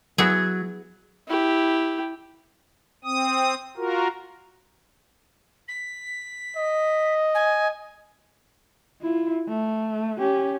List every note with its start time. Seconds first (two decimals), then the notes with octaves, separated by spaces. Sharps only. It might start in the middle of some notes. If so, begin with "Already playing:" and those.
0.18 F#3 B3 E4 G#4
1.28 E4 G4
3.04 C4 D#6
3.77 F4 F#4 A#4
5.68 B6
6.57 D#5
7.34 G#5
9.02 E4 F4
9.48 A3
10.19 C#4 G4